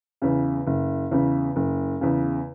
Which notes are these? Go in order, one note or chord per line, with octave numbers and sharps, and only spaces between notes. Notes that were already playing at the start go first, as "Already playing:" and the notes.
E2 C#3
F#1
E2 C#3
F#1
E2 C#3